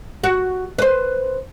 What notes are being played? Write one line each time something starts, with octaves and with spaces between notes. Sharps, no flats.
F#4
B4 C5